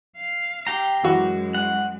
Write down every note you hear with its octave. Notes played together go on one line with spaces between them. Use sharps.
F5
G4 G5 A#5
F#2 E3 G#3 F#4
F#5